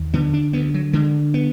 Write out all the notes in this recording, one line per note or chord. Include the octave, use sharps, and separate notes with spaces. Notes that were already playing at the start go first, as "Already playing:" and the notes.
Already playing: D#2
D3 B3
D4
D2 B3
F#3
D3 G#3
B3